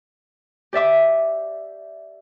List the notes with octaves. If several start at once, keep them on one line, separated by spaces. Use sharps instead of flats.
G4 D5 E5 D6